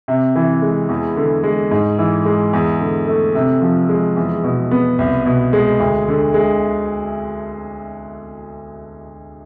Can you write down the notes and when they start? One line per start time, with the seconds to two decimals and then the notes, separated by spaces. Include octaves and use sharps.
0.08 C3
0.35 E3
0.62 G#3
0.89 E2
1.17 D3
1.43 G#3
1.71 G#2
1.98 E3
2.25 G#3
2.53 E2
2.81 D3
3.07 A3
3.35 C3
3.62 F3
3.89 G#3
4.16 E2
4.44 B2
4.71 B3
4.99 C2
5.25 B2
5.53 G#3
5.80 D2
6.08 D3
6.34 G#3